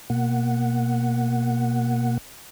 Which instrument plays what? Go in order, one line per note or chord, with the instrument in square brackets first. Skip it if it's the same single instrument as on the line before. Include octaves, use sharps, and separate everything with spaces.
[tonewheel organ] B2 A#3 F#5